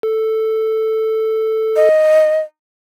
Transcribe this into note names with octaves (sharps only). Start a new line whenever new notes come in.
A4
D#5